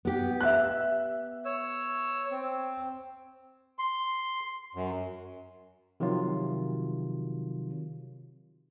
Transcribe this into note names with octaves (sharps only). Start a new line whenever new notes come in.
B3 G4
E5 F#6
C#5 E6
C4
C6
F#2
C3 D#3 F3 F#3 F4